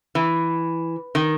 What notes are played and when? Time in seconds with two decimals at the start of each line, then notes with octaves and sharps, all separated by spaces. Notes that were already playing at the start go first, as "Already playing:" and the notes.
0.15 E3
1.15 D#3